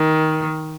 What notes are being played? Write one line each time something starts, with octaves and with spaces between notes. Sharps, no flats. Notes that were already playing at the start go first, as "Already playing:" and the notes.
Already playing: D#3